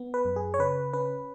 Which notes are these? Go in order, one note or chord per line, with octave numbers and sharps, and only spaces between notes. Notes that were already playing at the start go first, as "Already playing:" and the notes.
Already playing: B3
B4
F#2
G#4
C#5
C#3 B4
C#4 B4